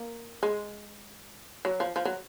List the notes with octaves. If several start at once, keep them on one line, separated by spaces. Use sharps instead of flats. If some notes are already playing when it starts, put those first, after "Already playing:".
Already playing: A#3
G#3
F#3
F3
F3
F#3